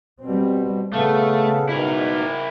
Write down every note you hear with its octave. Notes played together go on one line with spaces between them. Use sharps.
B2 G3 C4
C#3 A3 B3 A4 F5
G#2 B2 E4 A#4